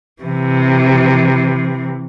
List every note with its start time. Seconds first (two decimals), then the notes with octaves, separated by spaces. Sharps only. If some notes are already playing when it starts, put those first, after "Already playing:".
0.22 C3 E3